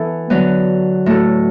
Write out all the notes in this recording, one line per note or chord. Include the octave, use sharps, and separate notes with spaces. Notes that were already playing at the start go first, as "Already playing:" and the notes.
Already playing: E3 B3 A4
D3 F#3 B3
A2 A3 F#4 A4